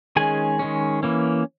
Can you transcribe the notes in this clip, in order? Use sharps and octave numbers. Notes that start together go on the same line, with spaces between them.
D#3 G#3 C#4 G#4 G#5
D#3 G#3 C#4
E3 A#3 C#4